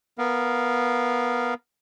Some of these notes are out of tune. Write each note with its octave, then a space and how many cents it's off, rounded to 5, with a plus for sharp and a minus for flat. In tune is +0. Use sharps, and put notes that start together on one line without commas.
B3 -10 A#4 +0 F5 +0